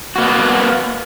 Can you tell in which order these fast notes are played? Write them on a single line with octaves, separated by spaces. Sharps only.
F#4 A#3 B3